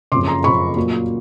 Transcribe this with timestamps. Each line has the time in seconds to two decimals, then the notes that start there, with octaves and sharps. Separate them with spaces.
0.12 C#3 C6 D6
0.14 F#1 F2
0.28 A#5 C6
0.44 F#1 F2 C#3 B5 C#6
0.76 A#2 F#3 A#3